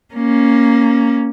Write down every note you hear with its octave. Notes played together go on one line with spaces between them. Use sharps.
A#3 C#4